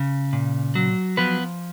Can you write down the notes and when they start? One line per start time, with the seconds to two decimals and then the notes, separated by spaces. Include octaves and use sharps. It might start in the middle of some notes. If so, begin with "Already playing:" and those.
Already playing: C#3
0.33 A#2
0.75 F#3
1.17 F3 B3 B4